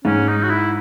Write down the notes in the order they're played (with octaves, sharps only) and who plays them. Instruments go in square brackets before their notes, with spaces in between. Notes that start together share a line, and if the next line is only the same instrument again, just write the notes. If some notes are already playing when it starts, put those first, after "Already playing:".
[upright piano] G#2 [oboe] C#4
[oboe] D#4
F#4
E4